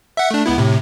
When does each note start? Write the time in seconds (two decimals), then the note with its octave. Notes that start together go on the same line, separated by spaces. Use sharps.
0.17 E5 F#5
0.31 A3 D4
0.46 C#2 B3 E4
0.58 A2 C3